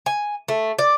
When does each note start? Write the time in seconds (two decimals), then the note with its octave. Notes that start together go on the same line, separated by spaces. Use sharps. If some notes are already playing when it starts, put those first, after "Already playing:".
0.06 G#5
0.48 A3
0.79 D5